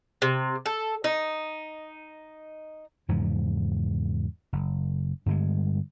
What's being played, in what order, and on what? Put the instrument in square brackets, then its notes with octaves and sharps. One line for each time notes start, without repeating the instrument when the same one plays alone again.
[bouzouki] C3
A4
D#4
[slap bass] E2 G#2 C#3 F3
F#1
G2 D3 G3 G#3